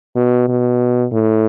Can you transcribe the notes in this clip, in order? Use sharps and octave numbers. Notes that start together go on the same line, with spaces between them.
B2
B2
A2